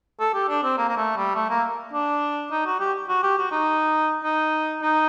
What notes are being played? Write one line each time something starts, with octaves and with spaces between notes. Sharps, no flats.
A4
G4
D4
C4
A#3
A#3
A3
G3
A3
A#3
D4
D#4
F#4
G4
F#4
G4
F#4
D#4
D#4
D#4